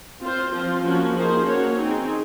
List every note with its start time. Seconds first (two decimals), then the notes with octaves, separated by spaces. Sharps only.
0.21 C4 F4 C5
0.52 F3 C4 F4
0.84 F3 A#3 C#4 F#4
1.14 F3 A#3 D#4 G#4 C5
1.45 A#3 C#4 F#4 C#5
1.76 C4 D#4 G#4